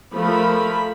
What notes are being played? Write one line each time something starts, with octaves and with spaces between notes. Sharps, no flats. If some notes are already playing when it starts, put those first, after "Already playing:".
F3 A3 A#4 B5